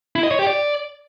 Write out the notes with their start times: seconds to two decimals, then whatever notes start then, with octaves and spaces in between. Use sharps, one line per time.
0.16 E4
0.23 D#5
0.31 C#5
0.39 G4
0.47 D5